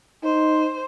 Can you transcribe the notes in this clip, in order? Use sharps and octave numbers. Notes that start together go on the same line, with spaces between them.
D#4 C5